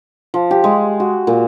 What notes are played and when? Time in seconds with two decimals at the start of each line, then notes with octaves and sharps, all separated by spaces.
0.34 F3
0.51 G4
0.64 G#3
1.00 F#4
1.27 A#2